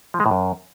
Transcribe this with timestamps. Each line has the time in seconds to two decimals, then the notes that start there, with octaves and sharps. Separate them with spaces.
0.14 F3
0.20 G#3
0.26 A2
0.31 F#2